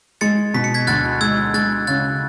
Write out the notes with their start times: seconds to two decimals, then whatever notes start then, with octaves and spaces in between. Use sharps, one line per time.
0.21 G#3 A6 C#7
0.54 B2 B6
0.64 C#7
0.74 G#6 B6
0.87 D2 F#6 A6
1.21 G#3 E6 G#6
1.54 G#3 F#6 A6
1.87 C#3 F#6 A6